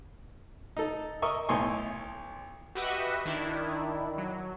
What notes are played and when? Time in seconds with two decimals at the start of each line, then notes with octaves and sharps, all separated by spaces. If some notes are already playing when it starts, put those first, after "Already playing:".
0.77 D#4 A4
1.22 A#4 D#5 E5 C#6
1.49 B1 A2 D#5 G#5 C6 C#6
2.75 F#4 G4 B4 D#5 E5 F#5
3.25 D#3 D4 E4
4.18 F#3